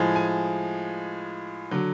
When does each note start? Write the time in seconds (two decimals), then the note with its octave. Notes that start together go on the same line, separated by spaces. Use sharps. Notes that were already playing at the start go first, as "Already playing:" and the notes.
Already playing: A2 F3 G#3
0.16 G#5
1.71 D3 F#3